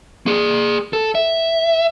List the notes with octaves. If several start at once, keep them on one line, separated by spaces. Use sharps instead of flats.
A#3 G#4
A4
E5